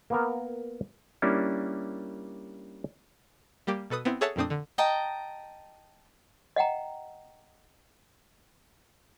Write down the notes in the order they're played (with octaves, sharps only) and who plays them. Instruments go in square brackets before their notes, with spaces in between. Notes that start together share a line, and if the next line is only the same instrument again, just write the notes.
[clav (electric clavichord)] A#3 B3 A#4
G3 A#3 C#4 D4 E4
[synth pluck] G3 A#3 G4
B2 A4 B4 D#6
B3 C4 E4
G#4 A4 C#5 E5 F#5 A5
F2 A#2 A3 C4 D4 D#6
D3
[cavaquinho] D#5 G5 A5 A#5
[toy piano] D#5 F#5 G5 A#5